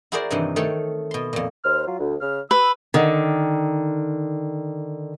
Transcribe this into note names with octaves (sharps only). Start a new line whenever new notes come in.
E4 F#4 G#4 A#4 C5 D5
G2 C3 D#3 E3
D#3 A3 C4 A4 C#5
B2 C6
F2 A#2
D#2 C5 F6
F#3 F4
D2
C#3 F6
B4 E6
D3 D#3